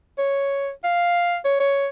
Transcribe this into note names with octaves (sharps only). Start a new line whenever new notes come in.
C#5
F5
C#5
C#5